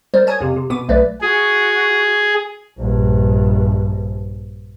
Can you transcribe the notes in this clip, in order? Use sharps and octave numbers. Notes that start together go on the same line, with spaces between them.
G3 A#4 C5
C#5 G#5 D#6 G#6
F2 C3
C3
B2 B3 D6 D#7
B1 A3 B4 D5
F#4 G#4
A#1 G2